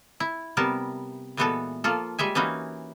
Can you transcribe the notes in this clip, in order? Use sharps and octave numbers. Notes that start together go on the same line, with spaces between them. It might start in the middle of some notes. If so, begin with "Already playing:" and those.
E4
C3 G3 B3 A#4 A5
A#2 E3 G#3 B3 F#4 A4
F3 A#3 F4 A4
G3 G#3 E5 G#5
E3 A#3 C#4 D#4 E4 F#4